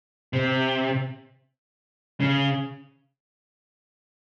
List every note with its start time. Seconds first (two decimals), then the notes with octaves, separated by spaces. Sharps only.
0.33 C3
2.20 C#3